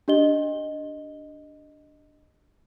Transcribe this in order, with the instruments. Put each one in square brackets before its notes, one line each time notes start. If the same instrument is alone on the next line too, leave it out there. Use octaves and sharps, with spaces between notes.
[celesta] D4 G4 D#5 G7